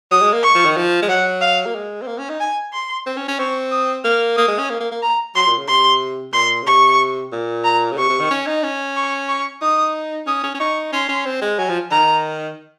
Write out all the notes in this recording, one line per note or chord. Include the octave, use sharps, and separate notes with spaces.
F#3 D#6
G#3
A#3
C#6
F3
D#3
F3
G#3
F#3 F#5
F5
A#3
G#3
C4
A#3
C#4
D#4
G#5
C6
C4
C#4
C#4
C4 C#6
D#6
A#3 F6
A#3 D#6
G#3
C#4
A#3
A#3
A#3
A#5
F#3 C6
A#2
C#3
C3 C6
A#2 C6
C#3
C3 C#6
A#2
A#5
C#3
C3 C#6
C3
D#3
C#4
D#4
C#4
C#6
C#6
D#4 D#6
C#4 D#6
C#4
C#4
D#4 C#6
C#4 C6
C#4
C4
G#3
F#3 G#5
F3
D#3 A#5